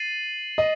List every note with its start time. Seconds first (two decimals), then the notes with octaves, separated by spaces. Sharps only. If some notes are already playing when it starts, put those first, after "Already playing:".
Already playing: A6 C7 D#7 F#7
0.58 D#5